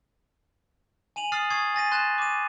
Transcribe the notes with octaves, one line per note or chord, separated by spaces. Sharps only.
G#5 D#7 F7 F#7
D#6 F6 A6 C7
C#6 D#6 G#6 C7
G#5 A6 A#6 D#7
C6 F#6 G6 A6 E7
D6 D#7